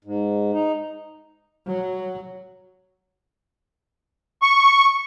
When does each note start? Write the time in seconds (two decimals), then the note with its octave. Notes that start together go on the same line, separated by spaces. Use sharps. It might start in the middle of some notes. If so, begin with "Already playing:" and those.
0.05 G#2
0.53 D#4
1.66 F#3
4.42 C#6